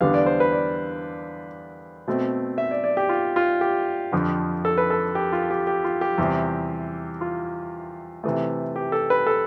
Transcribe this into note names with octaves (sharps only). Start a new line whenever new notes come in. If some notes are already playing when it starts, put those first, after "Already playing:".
E2 D3 G3 B3 D4 F5
D5
C5
B4
D5
B2 A3 C4
E5
D5
D5
G4
F4
F4
G4
F2 D3 F3
A4
B4
A4
G4
F4
G4
G4
F4
G4
E2 C3 G3 C4 E4
F4
C3 E3 A3
G4
A4
B4
A4